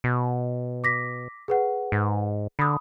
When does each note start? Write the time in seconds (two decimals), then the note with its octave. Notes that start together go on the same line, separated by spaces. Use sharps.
0.04 B2
0.84 D6 A#6 B6
1.48 G#4 B4 F#5
1.92 G#2
2.59 D3 B5 D#6